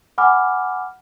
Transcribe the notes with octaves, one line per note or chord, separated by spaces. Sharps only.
F#5 G#5 B5 D6 F6